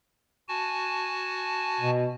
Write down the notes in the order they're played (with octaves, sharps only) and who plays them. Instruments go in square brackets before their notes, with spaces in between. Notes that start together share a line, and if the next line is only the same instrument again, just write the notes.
[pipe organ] F#4 G#5 A5
[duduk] B2